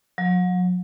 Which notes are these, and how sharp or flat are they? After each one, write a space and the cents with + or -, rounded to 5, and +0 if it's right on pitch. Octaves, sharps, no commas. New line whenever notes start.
F#3 -35